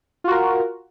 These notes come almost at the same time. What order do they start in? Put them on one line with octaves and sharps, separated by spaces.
F4 F#4 A#4